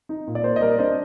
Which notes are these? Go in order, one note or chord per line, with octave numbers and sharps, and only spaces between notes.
D#4
A#2
D5
A#3 C5
D#5
G3 A#4 D5
D4 C5 D#5